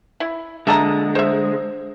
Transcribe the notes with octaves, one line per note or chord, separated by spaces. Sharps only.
E4
D3 G#3 E5 A5 A#5
C5 E5